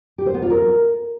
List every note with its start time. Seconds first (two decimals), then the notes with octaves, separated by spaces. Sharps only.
0.18 G4
0.26 C5
0.34 B3
0.42 F4
0.50 A#4